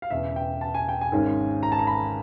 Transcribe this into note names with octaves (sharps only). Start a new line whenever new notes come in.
F5
E1 E2 C#3 E5
G5
A5
G#5
G5
G#5
G#1 G#2 D#3 G#3 C#4
A#5
A5
A#5
B5